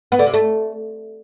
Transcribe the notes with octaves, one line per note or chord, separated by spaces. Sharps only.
B3
D3
C3
A3